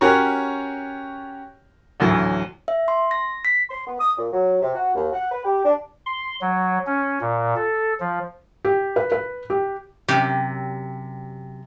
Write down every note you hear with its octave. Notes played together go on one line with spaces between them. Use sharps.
C#4 F#4 G4 A#4 C#5
A1 D2 E3 F#3
E5
C6
A#6
B6
C6
B3
D#6
A#2
F#3
C3
F#4
D#2
F#5
B4
G4
D4
C6
F#3
C#4
A#2
A4
F3
G4
B4
B4
G4
F#2 C3 G4